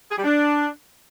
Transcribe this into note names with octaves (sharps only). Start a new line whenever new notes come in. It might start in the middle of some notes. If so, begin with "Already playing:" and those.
G#4
G3
D4